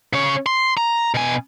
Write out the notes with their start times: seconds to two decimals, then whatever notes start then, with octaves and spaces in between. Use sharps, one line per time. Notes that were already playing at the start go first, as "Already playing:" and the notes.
0.13 C#3 C#5
0.46 C6
0.77 A#5
1.14 B2 G#5